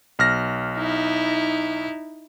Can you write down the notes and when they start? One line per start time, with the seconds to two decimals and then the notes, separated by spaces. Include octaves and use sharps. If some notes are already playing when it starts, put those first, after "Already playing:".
0.19 B1 F6 A#6
0.75 D#4 E4